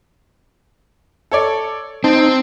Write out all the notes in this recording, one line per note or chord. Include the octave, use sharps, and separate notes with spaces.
A4 C#5 D5
C4 D#4 A5